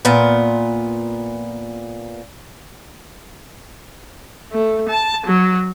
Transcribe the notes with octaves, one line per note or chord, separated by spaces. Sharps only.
A#2 B3
A3
A5
F#3